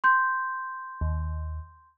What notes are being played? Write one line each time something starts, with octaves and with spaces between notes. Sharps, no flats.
C6 G6
D#2